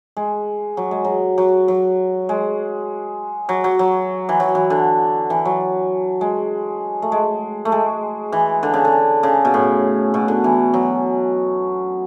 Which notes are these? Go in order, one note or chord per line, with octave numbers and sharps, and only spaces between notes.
G#3
F#3
G#3
F#3
F#3
F#3
G#3
F#3
F#3
F#3
E3
F#3
E3
D3
E3
F#3
G#3
A3
G#3
A3
G#3
E3
D3
C#3
D3
C#3
B2
A2
B2
D3
E3
F#3